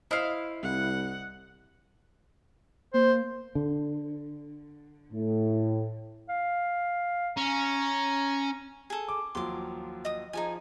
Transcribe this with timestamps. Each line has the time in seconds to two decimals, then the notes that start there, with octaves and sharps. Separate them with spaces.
0.11 E4 C5 D#5 F5 D#6
0.63 C2 F#5
2.94 A#3 C5
3.55 D3
5.13 A2
6.29 F5
7.37 C#4 A#5
8.90 G#4 A4
9.08 D6
9.35 D#2 F3 F#3 C6 D6
10.05 D#5 D#6
10.33 F3 D#4 G#4 G#5